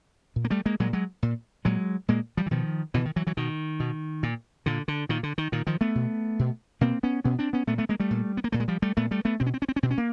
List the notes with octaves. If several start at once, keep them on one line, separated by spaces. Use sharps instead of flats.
A#2
A#3
G3 A3
G#3 A#3
A#2 F#3 G#3
F#3 G#3
A#2
A#2 F#3 G#3
A#2 G#3 A#3
F3 G3
E3
B2 D#3 F3
B2 D3 E3
D#3
E3 F#3
E3 F#3
B2 D#3
B2
A#2
A#2 D3
D3
A#2 D#3
D3
D#3
A#2 D#3
D#3 F3
A3 B3
B2
B2
B2 A#3 C4
B3 C#4
B2 B3 C#4
C4 D4
B3 C#4
A#2 A3 B3
A3 B3
G#3 A#3
G3 A3
A#2
B3
A#3
A#2 A3
G#3
F3 G3
G3 A3
A#2 A3 B3
G3 A3
A3 B3
B2 C4
C#4
C4
C#4
C4
C#4
B2 C4
C#4
A#3